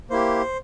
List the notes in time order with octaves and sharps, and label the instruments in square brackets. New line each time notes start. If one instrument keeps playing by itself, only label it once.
[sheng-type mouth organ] A#3 E4 G4 C5